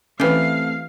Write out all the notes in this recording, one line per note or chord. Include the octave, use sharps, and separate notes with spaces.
E3 A3 C4 C#4 G4 A4 B4 F5